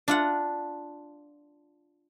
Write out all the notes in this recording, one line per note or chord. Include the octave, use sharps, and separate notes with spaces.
D4 F4 F#5